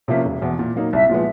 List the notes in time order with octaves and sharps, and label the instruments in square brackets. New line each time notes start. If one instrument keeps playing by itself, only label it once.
[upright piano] C3 F3 A#3 C#4 [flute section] E5
[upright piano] E1
E2 B2
A#2
F#3 A#3 D#4
[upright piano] C2 [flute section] E5
[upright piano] A#2 F3 G#3 B3